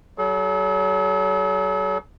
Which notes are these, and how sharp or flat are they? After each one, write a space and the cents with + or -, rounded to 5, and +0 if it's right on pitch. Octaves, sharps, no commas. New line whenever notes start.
F#3 +35 A4 -45